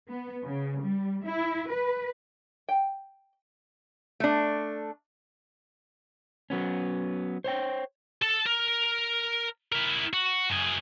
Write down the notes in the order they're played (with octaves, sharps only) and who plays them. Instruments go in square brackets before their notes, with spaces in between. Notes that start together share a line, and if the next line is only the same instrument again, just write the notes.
[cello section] B3
C#3
G3
E4
B4
[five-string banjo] G5
[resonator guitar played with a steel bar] A3 D4
[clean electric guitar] F#3 B3 C#4
C5 C#5 G5
[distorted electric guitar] A4 A5
A#4
E4 A#4
F#4
F#2 G#4